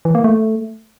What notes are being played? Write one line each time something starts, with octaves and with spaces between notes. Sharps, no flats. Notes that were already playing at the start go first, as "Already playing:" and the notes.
E3
A#3
A3